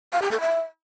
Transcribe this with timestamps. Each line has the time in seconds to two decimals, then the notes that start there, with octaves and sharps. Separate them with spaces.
0.13 F5
0.22 G4
0.31 A4
0.41 E5